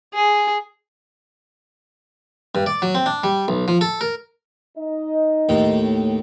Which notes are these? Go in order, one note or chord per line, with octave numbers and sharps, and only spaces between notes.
G#4
G2
D5
F#3
C4
D4
G3
B1
F3
A4
A#4
D#4 D#5
D#2 A2